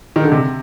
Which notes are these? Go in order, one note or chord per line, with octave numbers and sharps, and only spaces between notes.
D#3
D3
C3